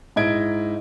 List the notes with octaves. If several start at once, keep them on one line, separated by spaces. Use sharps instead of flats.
G#2 D#4 E4 D#5 G#6 D7